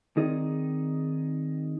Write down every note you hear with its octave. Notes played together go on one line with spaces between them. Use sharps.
D#3 C4 D#4 G#4 D5